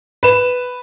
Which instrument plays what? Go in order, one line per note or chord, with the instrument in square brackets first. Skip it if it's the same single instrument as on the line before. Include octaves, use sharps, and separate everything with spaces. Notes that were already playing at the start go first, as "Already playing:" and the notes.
[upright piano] B4 E7